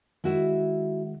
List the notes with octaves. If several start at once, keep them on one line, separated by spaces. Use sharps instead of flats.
D#3 G#3 E4 F#4 E5